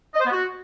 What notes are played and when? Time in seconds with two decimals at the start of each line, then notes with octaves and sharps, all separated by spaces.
0.14 D#5
0.20 C5
0.26 B3
0.32 F#4